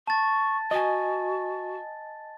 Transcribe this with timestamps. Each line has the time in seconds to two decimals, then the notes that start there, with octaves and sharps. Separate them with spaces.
0.07 A5 C#6 A6
0.71 F#4 D#5 G#5